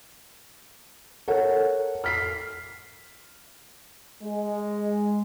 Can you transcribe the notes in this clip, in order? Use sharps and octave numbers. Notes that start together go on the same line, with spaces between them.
A4 A#4 C#5 F#5
F6 B6 C7
G#3